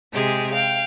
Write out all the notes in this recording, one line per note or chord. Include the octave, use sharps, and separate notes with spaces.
C3 G#3 G4 G#4
F5 G5